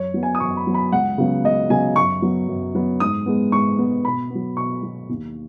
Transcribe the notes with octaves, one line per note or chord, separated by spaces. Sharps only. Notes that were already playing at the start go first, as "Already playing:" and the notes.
Already playing: F#2 C#5
F#3 B3
G#5
D#6
F#2 C#6
B5
F#3 B3
B5
C#2 F#5
C#3 F#3 B3
C#2 D#5
C#3 F#3 B3 G#5
F#2 C#6
F#3 B3
F#2
F#3 B3
G#2 D#6
G#3 B3
G#2 C#6
G#3 B3
B2 B5
B3
F#3
B2 C#6
F#3 B3
D#2